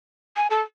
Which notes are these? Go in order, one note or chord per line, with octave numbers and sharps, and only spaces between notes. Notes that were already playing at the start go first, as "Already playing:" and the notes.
G#5
A4